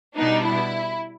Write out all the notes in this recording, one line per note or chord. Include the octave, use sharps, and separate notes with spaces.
B2 G3 B3 D4 D#4
E4